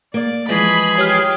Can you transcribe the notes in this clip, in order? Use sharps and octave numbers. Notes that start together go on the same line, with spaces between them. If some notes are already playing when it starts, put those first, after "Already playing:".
A#3 D5
E3 F3 G#3 G#4 B5
G4 C#5 D#6 F6